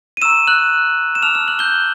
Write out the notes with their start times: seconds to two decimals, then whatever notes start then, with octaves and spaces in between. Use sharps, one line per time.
0.17 D#7
0.21 A#5 C#6 E6 F6 E7
0.47 F#6 F#7
1.15 E7
1.22 A5 D6 F6 F7
1.35 F6 F7
1.48 F#6 F#7
1.59 G6 G7